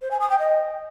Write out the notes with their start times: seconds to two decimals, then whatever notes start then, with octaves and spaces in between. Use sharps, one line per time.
0.01 C5
0.11 G#5
0.20 D#6
0.29 G5
0.39 D#5